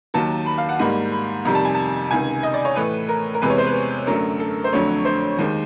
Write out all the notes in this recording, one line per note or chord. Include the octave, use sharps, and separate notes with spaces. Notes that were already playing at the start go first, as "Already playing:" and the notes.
D#2 D#3 F#3 A#3 A5
B5
F5
F#5
G#2 D#3 G3 A#3 B5
B5
F2 C3 D#3 G3 A#5
A5
G#5
A5
C#2 C3 D#3 G#5
D#5
D5
C#5
A2 E3 A3 B4
A#4
A#4
E2 C3 E3 G#3 B4
C#5
C5
B4
F#2 D3 F#3 A3 A#4
A4
C5
F2 D3 F#3 A3 C#5
C5
D#2 D#3 G#3